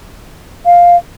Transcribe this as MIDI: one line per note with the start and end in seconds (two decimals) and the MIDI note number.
0.66 0.96 77